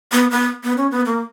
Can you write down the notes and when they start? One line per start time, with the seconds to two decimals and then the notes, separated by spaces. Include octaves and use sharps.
0.12 B3
0.31 B3
0.63 B3
0.77 C#4
0.91 B3
1.06 A#3